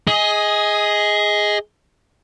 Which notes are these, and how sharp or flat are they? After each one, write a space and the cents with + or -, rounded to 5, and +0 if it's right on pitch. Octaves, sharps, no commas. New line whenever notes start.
G#4 +0 D#5 +20